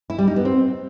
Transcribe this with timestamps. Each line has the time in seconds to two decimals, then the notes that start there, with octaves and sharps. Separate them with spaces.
0.10 E4
0.19 G3
0.27 D#4
0.36 B3
0.45 C4